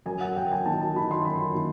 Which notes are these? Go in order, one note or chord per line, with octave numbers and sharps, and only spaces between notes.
F#2 G#5
F#5
F#2 G5
G#5
D#3 A5
A5
D#3 B5
C6
F#2 B5
D#3